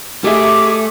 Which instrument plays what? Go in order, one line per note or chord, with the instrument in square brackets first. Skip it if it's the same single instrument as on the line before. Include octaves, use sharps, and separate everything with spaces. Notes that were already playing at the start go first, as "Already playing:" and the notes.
[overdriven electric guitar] A3 [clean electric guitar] G4 D#5 E5 [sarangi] G#4 [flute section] D6